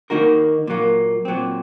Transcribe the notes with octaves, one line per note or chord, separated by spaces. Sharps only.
D#3 A#3 D#4 F#4 A#4
A#2 F#3 A#3
A#2 F#3 C4